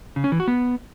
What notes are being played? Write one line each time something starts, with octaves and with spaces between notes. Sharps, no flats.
C#3
C#4
E3
F#4
B3